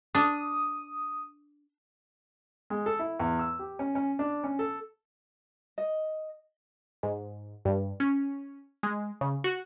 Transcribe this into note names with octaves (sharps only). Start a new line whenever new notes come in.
D4 D#6
G#3
A4
E4
E2
E6
G4
C#4
C#4
D4
C#4
A4
D#5
G#2
G2
C#4
G#3
C#3
F#4